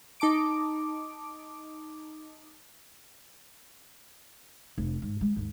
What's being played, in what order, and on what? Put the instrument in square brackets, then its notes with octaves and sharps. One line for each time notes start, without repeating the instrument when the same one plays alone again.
[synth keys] D#4 A5 D6 D7
[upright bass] F1
G#2
G#3
D#2 G#2